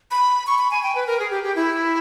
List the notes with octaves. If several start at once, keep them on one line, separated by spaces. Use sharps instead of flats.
B5
C#6
B5
G#5
G5
B4
A#4
G#4
G4
G4
E4